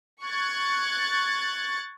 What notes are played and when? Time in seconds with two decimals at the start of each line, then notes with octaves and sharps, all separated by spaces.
0.23 C#6 F#6 G#6 A6